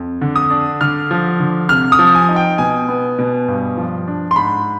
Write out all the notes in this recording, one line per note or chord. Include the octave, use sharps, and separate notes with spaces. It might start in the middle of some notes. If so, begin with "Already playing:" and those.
Already playing: F2
D3
D#6
D4
D3 F6
F3
D3
C3 F6
D#6
F3
G#5
D#4
G5
B2 G#5
B3
B2
G2
F3
D4
C6
G#2 B5